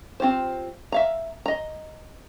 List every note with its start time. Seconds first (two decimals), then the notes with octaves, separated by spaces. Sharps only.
0.20 C4 F4 G4 C5
0.92 E5 F5 A#5
1.46 D#5 A#5